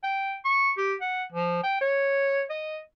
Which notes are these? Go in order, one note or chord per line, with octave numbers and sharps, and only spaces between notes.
G5
C#6
G4
F#5
F3
G5
C#5
D#5